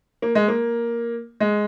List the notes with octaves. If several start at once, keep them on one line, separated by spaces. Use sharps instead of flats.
A#3
G#3
A#3
G#3